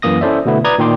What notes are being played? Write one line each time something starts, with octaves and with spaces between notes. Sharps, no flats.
F#2 E3 A#3 D#6 A#6
C#4 E4 A4 C5 D5 E5
B2 D3 A3 B3 E4
B4 D5 A#5 D#6 G#6
A#2 D#3 G5 C6 D6